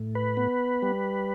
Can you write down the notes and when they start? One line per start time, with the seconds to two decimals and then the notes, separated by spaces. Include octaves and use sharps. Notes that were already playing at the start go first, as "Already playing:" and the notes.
Already playing: A2
0.15 B4
0.37 B3
0.82 G3